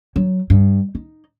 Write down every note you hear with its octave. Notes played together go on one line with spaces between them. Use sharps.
F#3
G2
D#4